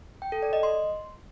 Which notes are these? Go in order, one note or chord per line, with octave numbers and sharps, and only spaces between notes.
G5
A4
D5
D#5
C6